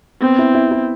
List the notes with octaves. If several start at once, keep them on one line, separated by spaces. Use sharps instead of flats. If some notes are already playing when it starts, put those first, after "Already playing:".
B3 C4
E4
E4
E4